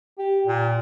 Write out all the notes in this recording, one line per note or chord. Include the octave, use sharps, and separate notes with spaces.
G4
A#2